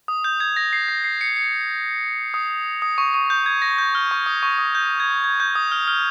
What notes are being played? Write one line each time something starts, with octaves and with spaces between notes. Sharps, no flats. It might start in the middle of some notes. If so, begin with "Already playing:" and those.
D#6
G6
G#6
A#6
C7
A#6
C7
C#7
C#7
D#6
D#6
C#6
C#6
G6
G#6
A#6
G6
F6
C#6
D#6
C#6
D#6
G6
G#6
G#6
G6
D#6
F6
F6